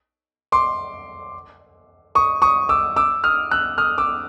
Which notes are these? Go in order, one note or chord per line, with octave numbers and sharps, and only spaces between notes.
C6 D6
C#6 D#6
C#6 D#6
D6 E6
D6 E6
D#6 F6
E6 F#6
D#6 F6
D6 E6